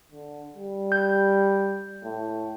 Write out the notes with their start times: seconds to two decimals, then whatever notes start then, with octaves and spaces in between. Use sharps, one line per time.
0.12 D3
0.57 G3
0.92 G6
2.03 A2